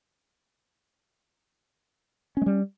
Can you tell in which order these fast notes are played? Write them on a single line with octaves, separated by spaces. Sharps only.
C#4 G#3 G3